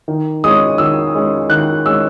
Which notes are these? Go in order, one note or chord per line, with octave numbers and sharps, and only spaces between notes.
D#3
G#3 C#4 D#6
D#3 E6
G#3 C#4
D#3 F#6
G#3 C#4 E6